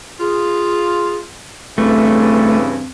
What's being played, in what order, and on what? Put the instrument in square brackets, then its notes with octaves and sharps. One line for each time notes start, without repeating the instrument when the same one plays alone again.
[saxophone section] F4 [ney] G#4
[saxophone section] G2 C#3 E3 [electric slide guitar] A3 [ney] C4